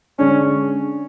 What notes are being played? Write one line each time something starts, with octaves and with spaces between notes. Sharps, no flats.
D3 G#3 C#4 D4 G#4